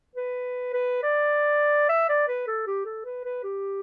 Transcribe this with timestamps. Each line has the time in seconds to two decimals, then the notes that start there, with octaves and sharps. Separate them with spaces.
0.16 B4
0.73 B4
1.03 D5
1.89 E5
2.09 D5
2.28 B4
2.47 A4
2.67 G4
2.85 A4
3.05 B4
3.24 B4
3.43 G4